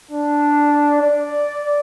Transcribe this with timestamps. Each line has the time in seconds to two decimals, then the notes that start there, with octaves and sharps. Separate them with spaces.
0.11 D4
1.01 D5